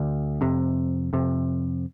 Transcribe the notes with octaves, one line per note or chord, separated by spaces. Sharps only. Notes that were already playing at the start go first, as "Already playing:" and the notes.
Already playing: D2 D3
F2 C3
F2 C3